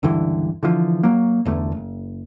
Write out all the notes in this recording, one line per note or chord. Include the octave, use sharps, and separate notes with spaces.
C#2 G2 D3 E3
D3 E3 F3
F#3 A#3
G1 E2 D3 A3
F#1